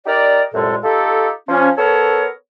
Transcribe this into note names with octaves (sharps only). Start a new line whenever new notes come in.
D#4 G4 A#4 D5
C2 F#2 A#2 G#3 A4
D#4 F4 G4 A4
F3 C#4
B3 A4 A#4 C#5